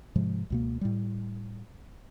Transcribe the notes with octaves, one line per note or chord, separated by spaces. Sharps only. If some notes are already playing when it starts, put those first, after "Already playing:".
G#2 C3 F3 G#3
C#2 B2 A#3
A2 G3